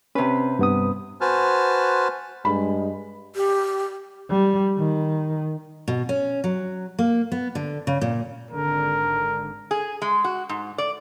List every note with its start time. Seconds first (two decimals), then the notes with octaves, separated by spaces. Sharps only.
0.15 C3 C#4 B4
0.59 G2 B3 D#6
1.21 F#4 B4 C5 G#5 A5 F6
2.45 G2 G#3 B5
3.36 G4
4.29 G3
4.77 D#3
5.88 B2
6.09 C#4
6.44 F#3
6.99 A#3
7.32 B3
7.55 D3
7.87 C#3
8.01 A#2
8.51 G#1 D3 A#4
9.71 G#4
10.02 G#3
10.24 F#4
10.49 G#2
10.78 D5